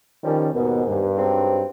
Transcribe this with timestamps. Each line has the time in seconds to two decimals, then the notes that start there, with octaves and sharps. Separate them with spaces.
0.24 A#2 D#3 F3 G3 C#4
0.54 D#2 G#2 B2
0.87 G2
1.17 G#2 F#3 C4